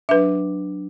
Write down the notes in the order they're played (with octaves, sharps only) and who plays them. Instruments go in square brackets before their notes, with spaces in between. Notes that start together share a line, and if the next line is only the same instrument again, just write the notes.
[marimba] F#3 D4 [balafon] B4 E5